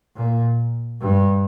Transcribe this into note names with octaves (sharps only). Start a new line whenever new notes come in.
A#2
G2